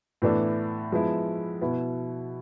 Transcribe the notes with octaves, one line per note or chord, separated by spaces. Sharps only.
A2 E3 B3 D4 A4
F3 G#3 B3 E4
B2 B3 E4